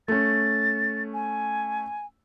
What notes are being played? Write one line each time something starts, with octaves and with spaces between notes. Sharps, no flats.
A3 C#4 A6
G#5